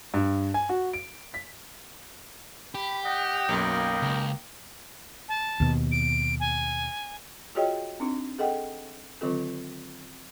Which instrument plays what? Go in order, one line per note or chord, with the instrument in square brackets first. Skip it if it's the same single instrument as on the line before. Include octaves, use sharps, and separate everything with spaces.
[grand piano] G2
G#5
F#4
D7
B6
[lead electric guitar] G4 [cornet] B5
[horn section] D#5 G5 [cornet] F#5
[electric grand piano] B1 F#2 [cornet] A#3
[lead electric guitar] C#2
[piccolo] A5
[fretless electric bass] D#2 B2
[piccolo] D7
G#5
[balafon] F4 F#4 G#4 C#5 D#5 G5
C4 D4 D#4
G#4 A4 D#5 F#5 G5
D3 D#3 F#3 C4 F4 A4